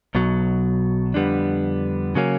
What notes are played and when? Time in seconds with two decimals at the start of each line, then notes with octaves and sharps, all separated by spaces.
0.15 B1 B2 F#3
1.14 F2 D3 G3 B3 D4
2.15 C#3 F#3 A#3 C#4